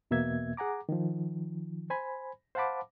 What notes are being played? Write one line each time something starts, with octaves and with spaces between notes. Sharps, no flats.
E2 B2 A#3 E5 G#6
G#4 F#5 G#5 A#5 D6
D#3 F3
C5 G#5 B5
C5 F5 F#5 A5 B5 D6